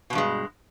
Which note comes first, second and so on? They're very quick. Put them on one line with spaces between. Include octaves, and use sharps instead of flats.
B2 E2 G2 G#3